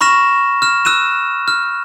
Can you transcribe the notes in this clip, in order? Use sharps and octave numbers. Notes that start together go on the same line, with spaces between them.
B5 C#6 F6 A#6 E7
F6 E7
E6 F#6 D#7 E7
F6